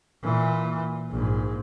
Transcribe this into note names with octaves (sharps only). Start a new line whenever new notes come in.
A#2 E3
A#1 G#2